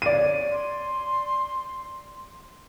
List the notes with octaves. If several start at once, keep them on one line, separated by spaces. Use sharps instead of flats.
C#5 D5 D#7
C6